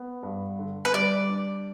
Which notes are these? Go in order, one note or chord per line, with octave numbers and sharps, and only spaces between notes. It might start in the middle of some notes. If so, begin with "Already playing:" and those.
Already playing: B3
G2
D3
B4
G3 D5
D4